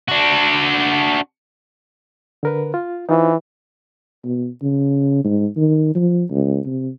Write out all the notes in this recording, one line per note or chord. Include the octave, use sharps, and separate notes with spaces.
D4 F#4
D3 A#4 B4
F4
E3 D#4 F4 C5
B2
C#3
G#2
D#3
F3
C#2
C3